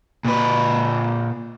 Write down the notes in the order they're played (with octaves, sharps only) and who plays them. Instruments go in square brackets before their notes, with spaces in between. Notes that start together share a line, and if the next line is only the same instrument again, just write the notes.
[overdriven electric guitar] A#2 B4